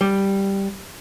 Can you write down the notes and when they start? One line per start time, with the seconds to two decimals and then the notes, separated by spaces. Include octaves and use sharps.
0.01 G3